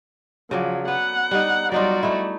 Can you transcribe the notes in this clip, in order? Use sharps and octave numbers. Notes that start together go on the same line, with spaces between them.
C#3 F3 F#3 D5
B3 F#5
G3 D#4
F#3 G3 D#4 F4 F#4 D5
A3 D#4 E4